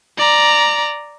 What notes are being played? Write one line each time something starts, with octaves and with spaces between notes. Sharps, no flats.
D5 A#5